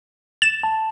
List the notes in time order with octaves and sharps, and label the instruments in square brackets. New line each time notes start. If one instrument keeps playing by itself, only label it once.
[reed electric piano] A6 [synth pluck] E7
[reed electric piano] A5